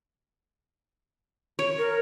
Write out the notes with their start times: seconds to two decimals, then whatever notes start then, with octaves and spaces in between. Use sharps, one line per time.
1.59 C#5
1.79 A#4